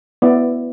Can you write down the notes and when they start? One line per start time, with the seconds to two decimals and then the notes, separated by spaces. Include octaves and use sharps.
0.22 B3 E4 D5